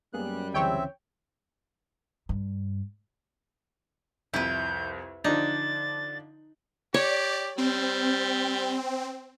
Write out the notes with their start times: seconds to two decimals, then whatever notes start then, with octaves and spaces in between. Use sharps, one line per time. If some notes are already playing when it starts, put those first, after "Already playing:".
0.14 F#2 G3 A#3 B3 G#4 F#6
0.54 D2 C#3 E3 C4 C#5 E5 G5
2.29 G2
4.34 C2 F2 E4 B4 G6
5.24 D3 F3 D4 D#4 A6
6.94 G4 C#5 D5
7.58 G3 C4